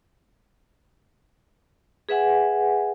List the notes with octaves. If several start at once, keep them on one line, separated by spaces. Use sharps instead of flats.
G#4 B4 E5 F#5 G#5